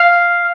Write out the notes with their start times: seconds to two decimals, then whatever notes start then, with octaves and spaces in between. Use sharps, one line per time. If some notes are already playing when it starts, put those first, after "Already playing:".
Already playing: F5